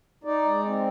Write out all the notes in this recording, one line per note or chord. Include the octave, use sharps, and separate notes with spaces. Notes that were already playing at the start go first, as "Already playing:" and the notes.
D#4 D5
G#3
C4